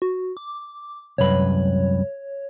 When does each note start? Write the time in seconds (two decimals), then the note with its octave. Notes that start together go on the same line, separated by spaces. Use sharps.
0.02 F#4
0.37 D6
1.18 C2 F#2 B4 C#5